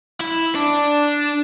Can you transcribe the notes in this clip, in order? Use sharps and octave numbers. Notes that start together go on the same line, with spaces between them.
E4
D4